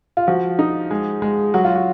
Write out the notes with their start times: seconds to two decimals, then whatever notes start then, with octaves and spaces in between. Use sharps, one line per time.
0.17 F4
0.27 F3 F#4
0.59 D#4
0.91 G#3
1.22 G#3
1.54 F#3 F#4
1.64 F4
1.76 F#4